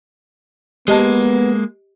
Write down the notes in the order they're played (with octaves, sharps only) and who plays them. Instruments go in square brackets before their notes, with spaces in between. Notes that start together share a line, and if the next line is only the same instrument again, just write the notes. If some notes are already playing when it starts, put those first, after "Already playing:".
[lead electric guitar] G#3 A#3 [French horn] B3 [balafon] G4 D#5 A5